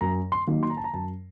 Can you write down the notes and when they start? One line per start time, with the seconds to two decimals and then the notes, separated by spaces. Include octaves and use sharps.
0.01 F#2 A#5
0.32 C6
0.47 D#3 F#3 A#3 D#4
0.63 C6
0.70 A#5
0.77 A5
0.84 A#5
0.94 F#2 A5